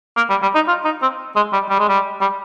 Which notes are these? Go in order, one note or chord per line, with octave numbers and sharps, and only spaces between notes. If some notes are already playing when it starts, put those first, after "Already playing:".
A#3
G3
G3
D#4
F4
D#4
C4
G#3
G3
G3
G#3
G3
G3